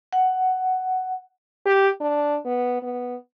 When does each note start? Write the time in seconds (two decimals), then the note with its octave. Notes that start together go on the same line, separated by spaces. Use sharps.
0.13 F#5
1.66 G4
2.01 D4
2.45 B3
2.83 B3